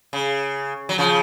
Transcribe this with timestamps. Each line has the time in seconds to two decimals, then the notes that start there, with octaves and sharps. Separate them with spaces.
0.13 C#3
0.89 F#3
0.98 C#3 F3